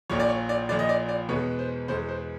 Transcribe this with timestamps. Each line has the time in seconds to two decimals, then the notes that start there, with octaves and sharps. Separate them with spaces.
0.10 A#1 A#2 F3 C#5
0.20 D5
0.29 C#5
0.49 D5
0.69 A#1 A#2 F3 D5
0.79 D#5
0.89 D5
1.09 D5
1.29 E2 B2 G#3 B3 C#5
1.59 C5
1.88 E2 B2 G#3 B3 C5
2.08 C5